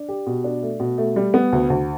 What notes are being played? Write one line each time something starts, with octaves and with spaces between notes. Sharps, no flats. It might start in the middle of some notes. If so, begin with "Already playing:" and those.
Already playing: D4
G4
B2
D4
A3
B2
A3
G3
B3
D2
D2